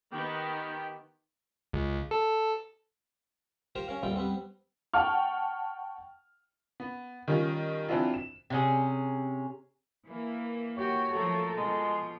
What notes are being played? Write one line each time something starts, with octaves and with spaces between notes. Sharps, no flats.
D#3 B3 G4 G5
C#2
A4
F4 G4 A#4 C5 F5
C#4 A#4 F5
A1 E2 A#2 G3 F4 G5
G3 B3 C4
F#5 G5 A5 C#6 F6
B3
D#3 G3 C#4 F4
E3 F#3 C4 D4 E4 F4
E7
C3 C#4 G#4
E3 A#3
F#4 G4 C#5
F3 F#3 A3 A4 A#4
B2 F3 G#3